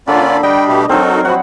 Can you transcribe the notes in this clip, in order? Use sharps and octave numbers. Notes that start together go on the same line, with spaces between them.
D3 A#3 C#4 F4 A4 D5 B5
G3 D4 D#5 G5 B5
B2 A3 G4
F#3 C4 D#4 F#4 A4 A#4
F3 F#4 F#5 B5